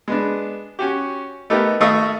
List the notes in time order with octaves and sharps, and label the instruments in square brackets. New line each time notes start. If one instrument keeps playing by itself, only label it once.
[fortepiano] G#3 B3 D4
C#4 F#4 G4
A3 B3 D#4 G4 A#4
G#1 A3 D#5 F5 C#6 D#6